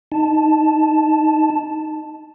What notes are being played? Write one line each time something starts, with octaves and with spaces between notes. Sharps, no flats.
D#4 A5